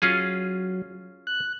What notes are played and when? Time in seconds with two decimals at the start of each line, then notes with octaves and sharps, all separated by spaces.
0.02 F#3 C#4 F4 G#4
1.27 F#6